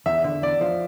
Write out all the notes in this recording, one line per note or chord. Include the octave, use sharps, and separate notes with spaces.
E2 E5
D3
E2 D5
F3